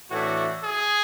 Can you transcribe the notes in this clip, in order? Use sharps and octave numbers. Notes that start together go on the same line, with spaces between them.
A2 E3 A3 D4 F#4
G#4